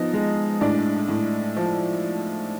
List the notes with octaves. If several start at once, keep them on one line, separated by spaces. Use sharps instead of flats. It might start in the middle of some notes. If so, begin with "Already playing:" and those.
Already playing: F3 B3 D#4 D#5
G#3
A2 D4 D5
A2
F3